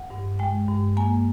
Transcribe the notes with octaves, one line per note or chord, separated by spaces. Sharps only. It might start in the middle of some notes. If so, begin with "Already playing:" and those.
Already playing: F#5
G2
G#3 G5
G2
A#3 G#5